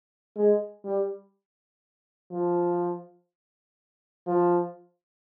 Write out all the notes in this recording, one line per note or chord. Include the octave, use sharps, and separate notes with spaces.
G#3
G3
F3
F3